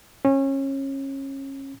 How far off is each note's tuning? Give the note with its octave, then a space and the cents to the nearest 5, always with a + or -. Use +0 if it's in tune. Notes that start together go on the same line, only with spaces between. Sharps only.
C#4 -25